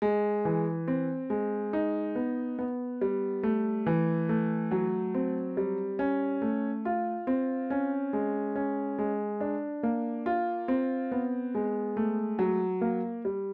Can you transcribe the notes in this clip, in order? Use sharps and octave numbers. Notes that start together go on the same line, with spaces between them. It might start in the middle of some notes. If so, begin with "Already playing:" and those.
G#3
E3
C4
G#3
D#4
B3
B3
G3
A3
E3
A3
F#3
C4
G3
C#4
A3
F4
C4
C#4
G#3
C#4
G#3
D4
A#3
F4
C4
B3
G#3
A3
F#3
A#3
G3